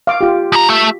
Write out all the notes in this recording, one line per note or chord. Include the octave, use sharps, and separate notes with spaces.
F5 D6
F4 G4
F2 A#5
A3 E5